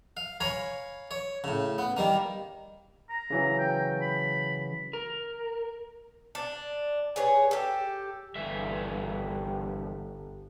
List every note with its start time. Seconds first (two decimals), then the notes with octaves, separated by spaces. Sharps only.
0.17 F5
0.41 C#5 F5 G#5 A#5 B5
1.11 C#5
1.44 A2 C#3
1.78 B3
1.97 D#3 G3 A#3
3.10 A#5
3.30 C#3 E3 F#3
3.59 G5
4.02 B5
4.93 A#4
6.35 D4
7.16 G#4 B4 C#5
7.51 G4 A4
8.36 G1 G2 E3 E5